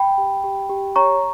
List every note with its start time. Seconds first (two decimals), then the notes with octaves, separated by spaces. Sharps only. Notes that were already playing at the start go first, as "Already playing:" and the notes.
Already playing: G5 B5
0.18 G4
0.44 G4
0.69 G4
0.96 C#5 A#5 C#6